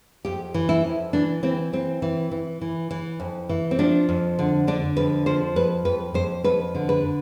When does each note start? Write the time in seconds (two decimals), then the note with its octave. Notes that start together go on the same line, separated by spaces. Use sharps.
0.25 F2 G4
0.54 E3
0.69 E4
0.84 F2
1.13 E3 D4
1.43 E3 C4
1.73 E3 C4
2.02 E3
2.31 E3
2.61 E3
2.91 E3
3.20 F2
3.49 E3
3.71 C4
3.79 F3 D4
4.09 F2
4.39 D3
4.67 D3 D4
4.97 F2 B4
5.26 F3 C5
5.56 F2 B4
5.85 F2 B4
6.14 F2 C5
6.44 F2 B4
6.75 D3
6.89 B4